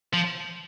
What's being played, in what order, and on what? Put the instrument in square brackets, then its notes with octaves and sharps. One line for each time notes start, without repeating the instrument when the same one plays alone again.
[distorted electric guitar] F3